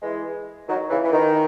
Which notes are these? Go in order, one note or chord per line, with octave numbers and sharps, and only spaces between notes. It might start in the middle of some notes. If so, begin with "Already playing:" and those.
E3 G#3
D#3 F#3
C#3 E3
E3
D#3